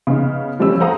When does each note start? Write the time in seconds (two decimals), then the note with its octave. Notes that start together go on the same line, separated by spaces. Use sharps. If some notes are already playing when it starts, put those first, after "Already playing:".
0.07 C#3 B3 D#4
0.60 F3 G3 A3 C#4 E6
0.80 A4 C5 F5 F#5 A#5 D#6